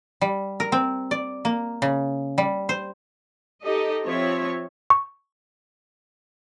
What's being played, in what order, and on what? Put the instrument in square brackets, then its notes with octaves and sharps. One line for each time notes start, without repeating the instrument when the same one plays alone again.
[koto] G3
A#4
C4
D5
A#3
C#3
G3
C5
[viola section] D#4 G4 A4 D#5
F3 C4 F4 C#5 E5
[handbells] C#6